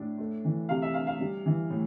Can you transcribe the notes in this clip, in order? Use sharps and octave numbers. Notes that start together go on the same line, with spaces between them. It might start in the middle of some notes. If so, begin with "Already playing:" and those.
Already playing: A2 D4
A3
E3
C3 F5
E5
D4 F5
F5
G3
E3
A2